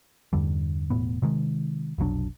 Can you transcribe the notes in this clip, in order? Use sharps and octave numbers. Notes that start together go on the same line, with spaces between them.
E2 G2 D3 G3
E1 A2 B3
C3 D#3 G#3
F1 B1 F#3 D4